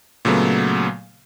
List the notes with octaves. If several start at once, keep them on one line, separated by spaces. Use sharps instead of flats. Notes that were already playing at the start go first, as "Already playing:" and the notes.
A#2 C#3 F#3 A3 B3